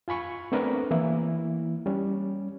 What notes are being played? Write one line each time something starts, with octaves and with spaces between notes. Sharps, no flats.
F4 G#5 B5 C#6
A3 B3 C4 D4 A#4 B4
E3 A#3 E4
G3 C#4